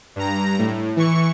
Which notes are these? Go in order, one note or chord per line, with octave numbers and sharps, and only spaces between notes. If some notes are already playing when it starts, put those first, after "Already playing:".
G2 A#5
A2
E3 C#6